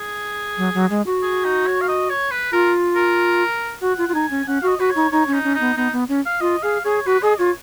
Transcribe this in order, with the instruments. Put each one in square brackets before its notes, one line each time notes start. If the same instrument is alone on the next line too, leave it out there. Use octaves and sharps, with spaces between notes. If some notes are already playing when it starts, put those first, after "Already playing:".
Already playing: [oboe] G#4
[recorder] F#3
F#3
G#3
F#4
[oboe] G#4
D#4
C#5
F5
D#5
C#5
B4
[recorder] F4 [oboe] A#4
[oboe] A#4
[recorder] F#4 [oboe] F#5
[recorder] F4
F4
[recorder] D#4 [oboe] G#5
[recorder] C#4
[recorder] C#4 [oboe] F#5
[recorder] F#4 [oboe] F5
[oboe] D#5
[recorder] F#4 [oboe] B4
[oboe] C#5
[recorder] D#4
[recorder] D#4 [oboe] C#5
[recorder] C#4
[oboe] D#4
[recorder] C#4
[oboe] D#4
[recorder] B3
[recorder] B3 [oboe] D#4
[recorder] B3
C#4
[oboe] F5
[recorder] F4 [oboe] D#5
[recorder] G#4 [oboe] F5
[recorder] G#4 [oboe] C#5
[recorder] F#4 [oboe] B4
[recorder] G#4 [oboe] D#5
[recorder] F4 [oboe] C#5